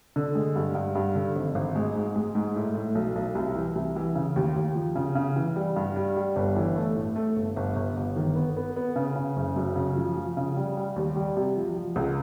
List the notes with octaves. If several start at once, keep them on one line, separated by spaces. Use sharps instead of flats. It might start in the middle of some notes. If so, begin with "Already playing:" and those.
D3
G#3
G2
G2
G2
D3
G#1
G#1
G#3
G#2
G#3
G#2
A2
A2
B1
B1
C2
E3
C2
E3
C#3
D#2
D#2
F3
C#3
C#3
E3
G3
G2
G3
G3
G1
E3
A3
A2
A3
G1
G1
G1
G1
D#3
B3
B3
B3
C#3
C#3
F#1
F#2
C#3
F3
F3
C#3
G3
G3
D#2
G3
C3
F3
F3
C#2